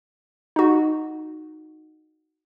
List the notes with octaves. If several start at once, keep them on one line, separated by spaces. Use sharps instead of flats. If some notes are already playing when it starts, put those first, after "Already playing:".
D#4 F#4